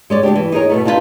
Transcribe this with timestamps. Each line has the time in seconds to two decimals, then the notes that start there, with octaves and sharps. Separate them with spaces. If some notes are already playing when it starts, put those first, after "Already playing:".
0.10 G#3 C#5 D5
0.23 D2 G2 D4 G4
0.36 E3
0.52 D#4 G#4 A#4 C#5
0.69 B2 A3 B3
0.85 D4 D#4 F4 F#4 B4 C5